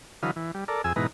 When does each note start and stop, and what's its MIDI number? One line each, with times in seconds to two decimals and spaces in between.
0.23 0.31 50
0.23 0.31 52
0.23 0.31 54
0.23 0.31 71
0.23 0.31 75
0.23 0.31 77
0.36 0.52 52
0.54 0.64 55
0.68 0.82 69
0.68 0.82 70
0.68 0.82 74
0.84 0.93 41
0.84 0.93 68
0.84 0.93 80
0.84 0.93 88
0.96 1.07 44
0.96 1.07 47
0.96 1.07 52
0.96 1.07 63
0.96 1.07 71
0.96 1.07 82